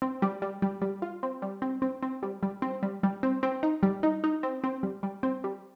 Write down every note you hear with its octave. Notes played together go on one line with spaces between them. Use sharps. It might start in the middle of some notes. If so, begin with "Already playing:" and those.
C4
G3
G3
G3
G3
F4
C4
G3
C4
C4
C4
G3
G3
C4
G3
G3
C4
C4
D#4
G3
D#4
D#4
C4
C4
G3
G3
C4
G3